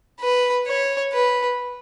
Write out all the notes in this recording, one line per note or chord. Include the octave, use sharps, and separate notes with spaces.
B4
C#5
B4